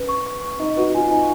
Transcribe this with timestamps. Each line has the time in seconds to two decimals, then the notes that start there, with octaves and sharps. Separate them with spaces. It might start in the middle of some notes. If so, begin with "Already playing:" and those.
Already playing: C#4 B4
0.09 C#6
0.26 C#6
0.42 C#6
0.59 D#4 D#5
0.77 F#4 B4
0.94 F4 G#5
1.10 D#4 G#5